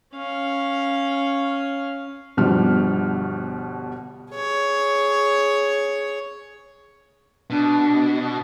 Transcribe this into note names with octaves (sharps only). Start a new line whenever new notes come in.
C#4 F5
G1 B2 F3 G3 F6
G#4 C#5
B2 D4